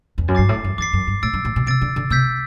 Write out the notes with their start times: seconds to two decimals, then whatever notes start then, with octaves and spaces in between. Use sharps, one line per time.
0.18 E2
0.28 F#2
0.35 G2 D6 A6 C7
0.49 A2
0.64 F#2
0.78 E2 D6 A6 C7
0.93 F#2
1.07 G2
1.23 A2 E6 A6 D7
1.33 G2
1.45 A2
1.56 B2
1.66 C3 E6 A6 D7
1.81 D3
1.96 D3
2.10 C3 E6 G6 B6